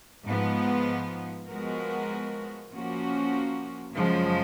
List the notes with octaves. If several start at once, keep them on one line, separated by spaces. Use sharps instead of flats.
G#2 F3 B3
F3 G#3 B3 F#4 A#4
F3 A#3 C#4 F#4
F#2 C#3 F3 G#3